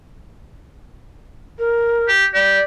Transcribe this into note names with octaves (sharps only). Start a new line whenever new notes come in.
A#4
G4
G4 D5